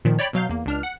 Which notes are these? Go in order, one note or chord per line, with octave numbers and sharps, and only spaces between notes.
A#2 D#3 F3
C#5 D5 G5 B5
B2 F#3 F5 G6
E2 A#3
C#2 D4 F6
F#5